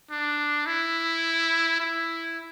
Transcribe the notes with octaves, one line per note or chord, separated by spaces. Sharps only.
D4
E4
E4